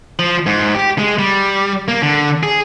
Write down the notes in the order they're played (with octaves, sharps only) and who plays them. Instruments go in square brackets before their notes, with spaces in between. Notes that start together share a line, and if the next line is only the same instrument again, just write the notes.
[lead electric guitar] F3
G#2
G4
G#3
G3
A#3
D3
G#4